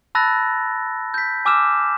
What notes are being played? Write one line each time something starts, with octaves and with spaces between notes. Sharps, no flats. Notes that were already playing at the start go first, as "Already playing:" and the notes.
A5 B5 E6 F#6 A6 A#6
G6 B6
G#5 D6 E6 F6 E7